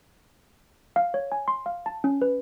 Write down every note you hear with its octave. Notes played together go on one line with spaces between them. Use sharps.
F5
C#5
G#5
C6
F5
A5
C#4
B4